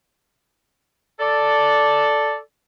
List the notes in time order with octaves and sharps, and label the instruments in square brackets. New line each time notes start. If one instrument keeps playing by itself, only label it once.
[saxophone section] A4 D5